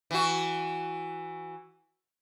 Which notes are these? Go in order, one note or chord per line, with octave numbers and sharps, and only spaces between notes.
E3 F#4